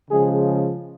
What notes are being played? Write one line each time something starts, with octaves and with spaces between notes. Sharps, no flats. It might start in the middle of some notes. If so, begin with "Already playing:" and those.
C#3 F3 G#3 G#4